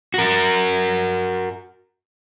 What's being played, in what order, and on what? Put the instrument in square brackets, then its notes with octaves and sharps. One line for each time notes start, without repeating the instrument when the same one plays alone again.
[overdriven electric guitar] F#4 A#4